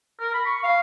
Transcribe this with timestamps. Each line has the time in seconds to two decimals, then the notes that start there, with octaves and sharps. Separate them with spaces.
0.19 A#4
0.33 B5
0.46 C#6
0.63 F5